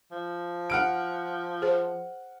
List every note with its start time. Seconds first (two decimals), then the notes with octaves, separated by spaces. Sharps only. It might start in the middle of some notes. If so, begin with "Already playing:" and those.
0.11 F3
0.70 F#5 F6 D7
1.62 G#4 C5